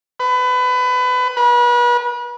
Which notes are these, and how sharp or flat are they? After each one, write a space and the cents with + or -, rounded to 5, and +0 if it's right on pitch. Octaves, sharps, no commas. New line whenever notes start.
B4 +25
B4 -35